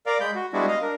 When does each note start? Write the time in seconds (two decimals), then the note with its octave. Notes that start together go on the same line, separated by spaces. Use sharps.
0.06 A#4 D5 F5
0.20 G#3 B5 G6
0.35 F#4
0.53 G3 G#3 B3 D4 E4 F#4
0.68 D#5 F5
0.82 D4 A#4